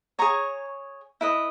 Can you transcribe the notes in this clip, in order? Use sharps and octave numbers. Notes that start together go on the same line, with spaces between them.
G#4 C#5 A#5 C#6
E4 B4 D#5